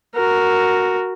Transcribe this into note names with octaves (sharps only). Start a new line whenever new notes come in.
F#4 A#4